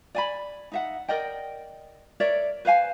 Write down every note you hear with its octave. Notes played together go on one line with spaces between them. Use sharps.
D5 G#5 B5
D#4 E5 F#5
A#4 D5 D#5 G5
A#4 C#5 D5 E5
B4 C5 F5 G#5